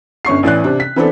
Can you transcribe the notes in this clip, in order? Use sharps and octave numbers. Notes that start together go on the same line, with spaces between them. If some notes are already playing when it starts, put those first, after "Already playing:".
G1 C#4 C#6 C7
A1 E3 D5 F#6
C3 D4
B6
E3 B3 C4 D4 A4